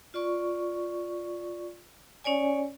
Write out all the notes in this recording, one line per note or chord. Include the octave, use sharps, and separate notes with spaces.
F4 D5 C#6
C#4 C#5 D5 G#5